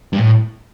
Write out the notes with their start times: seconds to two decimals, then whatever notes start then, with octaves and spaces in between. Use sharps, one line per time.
0.13 G2
0.18 A2